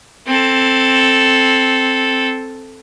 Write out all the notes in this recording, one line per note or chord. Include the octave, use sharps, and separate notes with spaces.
C4 A4